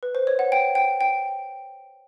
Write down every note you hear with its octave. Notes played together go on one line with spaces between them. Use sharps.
B4
C5
C#5
F#5
G5
G5
G5